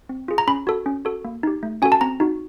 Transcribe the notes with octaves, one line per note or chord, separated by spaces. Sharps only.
C4
F4 G#4
A#5
C#4 B5
F#4 A4
C#4
F#4 A4
A#3
D#4 G4
A3
C#4 F#4 A4 G#5
A5
C4 A#5
D#4 F#4